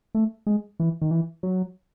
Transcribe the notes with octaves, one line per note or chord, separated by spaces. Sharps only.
A3
G#3
E3
D#3
E3
F#3